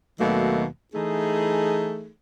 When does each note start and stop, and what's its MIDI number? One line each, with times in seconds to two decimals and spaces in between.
0.19 0.65 39
0.19 0.65 47
0.19 0.65 51
0.19 0.65 54
0.19 0.65 57
0.19 0.65 58
0.93 2.09 52
0.93 2.09 57
0.93 2.09 63
0.93 2.09 68